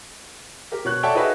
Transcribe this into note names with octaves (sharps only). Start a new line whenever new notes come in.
G4 A#4
B2 C#5 F#6
A4 C#5 D5 E5 F#5 G5
D#4 F#4 G#4 B4 C#5 E5